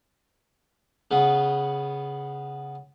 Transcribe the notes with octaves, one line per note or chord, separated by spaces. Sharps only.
C#3 B3